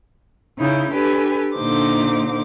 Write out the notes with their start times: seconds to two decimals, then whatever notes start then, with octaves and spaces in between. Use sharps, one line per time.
0.58 C#3 D#4 E4 G6
0.91 D4 G4 A4 B4 G#5
1.55 A#2 D3 D#4 C5 D6